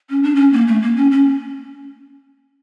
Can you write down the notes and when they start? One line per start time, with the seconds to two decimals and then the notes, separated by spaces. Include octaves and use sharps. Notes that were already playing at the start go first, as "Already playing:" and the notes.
0.10 C#4
0.23 D4
0.35 C#4
0.53 A#3
0.68 A3
0.82 A#3
0.97 C#4
1.11 C#4